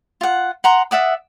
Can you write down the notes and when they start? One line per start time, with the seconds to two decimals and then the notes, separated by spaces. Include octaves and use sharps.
0.21 F4 F#5
0.64 F#5 A#5 C6
0.91 D5 E5 F#5 D#6